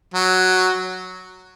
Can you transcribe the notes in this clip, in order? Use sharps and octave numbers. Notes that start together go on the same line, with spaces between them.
F#3